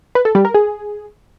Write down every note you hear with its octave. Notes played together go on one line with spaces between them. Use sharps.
B4
A4
G3
A#4
G#4